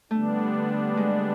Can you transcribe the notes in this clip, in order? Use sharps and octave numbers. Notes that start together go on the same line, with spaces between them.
D3 G3 A3 B3 D4
G#3